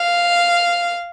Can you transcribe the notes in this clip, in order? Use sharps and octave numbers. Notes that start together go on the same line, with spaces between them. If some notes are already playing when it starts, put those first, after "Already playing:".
Already playing: F5